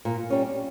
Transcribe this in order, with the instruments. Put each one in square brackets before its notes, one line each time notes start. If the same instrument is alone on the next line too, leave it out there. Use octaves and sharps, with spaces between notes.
[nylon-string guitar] A#2
G3 C#4